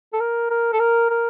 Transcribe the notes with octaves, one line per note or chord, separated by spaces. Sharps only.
A4
A#4
A#4
A4
A#4
A#4